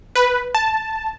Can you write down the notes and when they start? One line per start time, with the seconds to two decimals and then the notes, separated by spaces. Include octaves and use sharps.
0.15 B4
0.55 A5